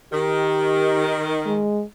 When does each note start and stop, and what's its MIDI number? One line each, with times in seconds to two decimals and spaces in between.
0.13 1.63 51
0.13 1.21 67
1.46 1.83 56